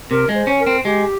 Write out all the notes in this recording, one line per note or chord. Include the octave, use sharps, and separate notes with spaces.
C3 A#4
G#3
C5
C#4
A#4
C4
G#3 G4